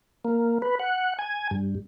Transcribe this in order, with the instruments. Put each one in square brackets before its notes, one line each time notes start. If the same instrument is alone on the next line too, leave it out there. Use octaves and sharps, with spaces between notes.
[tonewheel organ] A#3
B4
F#5
G#5
G2